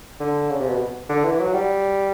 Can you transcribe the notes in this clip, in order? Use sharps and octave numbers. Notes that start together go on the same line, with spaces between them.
D3
C#3
C3
B2
D3
E3
F#3
G3